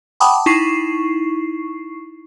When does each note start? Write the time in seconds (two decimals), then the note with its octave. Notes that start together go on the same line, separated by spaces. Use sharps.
0.20 F#5 G5 A5 B5 D6 D#6
0.46 D#4 E4 C#6 C7